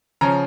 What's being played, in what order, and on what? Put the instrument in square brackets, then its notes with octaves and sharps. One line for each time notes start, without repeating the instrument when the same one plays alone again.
[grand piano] C#3 F3 C#4 A#5